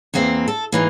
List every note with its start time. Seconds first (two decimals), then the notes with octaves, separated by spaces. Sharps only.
0.14 E2 E3 A#3 C4
0.48 A4
0.72 G#2 E3 A#3